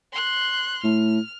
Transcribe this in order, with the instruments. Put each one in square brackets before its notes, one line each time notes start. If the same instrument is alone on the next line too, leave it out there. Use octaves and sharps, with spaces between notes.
[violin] C6 F#6
[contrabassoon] A2 [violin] F6